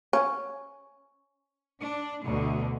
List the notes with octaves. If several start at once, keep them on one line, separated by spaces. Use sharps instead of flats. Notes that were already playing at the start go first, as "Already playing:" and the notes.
C#4
D4
D2 B2 D3